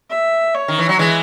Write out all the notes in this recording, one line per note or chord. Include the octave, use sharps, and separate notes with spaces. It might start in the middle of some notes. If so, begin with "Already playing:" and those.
E5
C#5
D#3
E3
F#3
E3 G#3